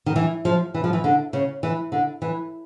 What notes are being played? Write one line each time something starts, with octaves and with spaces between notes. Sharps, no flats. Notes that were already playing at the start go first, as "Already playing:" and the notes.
D#3
E3
F3
E3
F3
E3
D3
C#3
E3
D3
E3